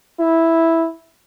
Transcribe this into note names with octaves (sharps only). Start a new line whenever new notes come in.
E4